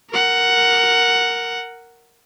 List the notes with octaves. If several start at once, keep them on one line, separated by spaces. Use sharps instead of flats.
A#4 F#5